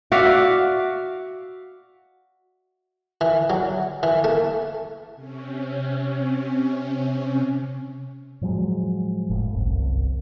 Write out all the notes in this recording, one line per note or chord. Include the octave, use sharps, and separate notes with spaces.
F#4 D5 E5 F5
E3
F#3
E3
A3
C3 C#4
A2 F3 F#3 G#3
F#1 A2
G1 C2 F#2